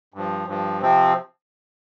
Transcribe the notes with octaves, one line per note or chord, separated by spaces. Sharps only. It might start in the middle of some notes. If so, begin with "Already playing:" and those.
G2 F3
G2 F3
C3 F3 C4